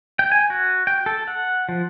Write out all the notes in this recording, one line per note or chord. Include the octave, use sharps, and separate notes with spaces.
G5
G#5
F#4
G5
A4
F#5
F3